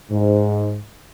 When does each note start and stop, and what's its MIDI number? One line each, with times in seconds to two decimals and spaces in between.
0.11 0.78 44